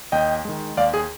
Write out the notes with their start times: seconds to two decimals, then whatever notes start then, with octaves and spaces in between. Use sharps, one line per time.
0.12 D#2 D#5 G5
0.45 D#3 G#3
0.77 D#2 D5 F5
0.94 G#4